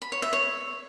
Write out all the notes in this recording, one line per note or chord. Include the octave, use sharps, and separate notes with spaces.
B5
C#5
E5
C#5